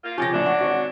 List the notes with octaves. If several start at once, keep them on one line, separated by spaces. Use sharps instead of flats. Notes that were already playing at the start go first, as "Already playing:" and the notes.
A#3 F4
C#3 F3 C#4 G4 G#5 A6 A#6
A#1 A2 F#3 C#4 D4
F#5 C#6
G#1 F#4 C#6